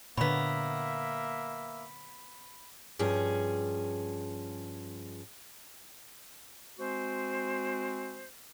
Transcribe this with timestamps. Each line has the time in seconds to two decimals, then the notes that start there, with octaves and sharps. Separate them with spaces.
0.17 A#2 D3 F#3 A#3 B3 E5 B5 B6
2.99 G2 F3 C#4 G#4
6.79 G#3 C4 F#4 C5